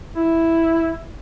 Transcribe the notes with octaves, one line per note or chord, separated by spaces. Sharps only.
E4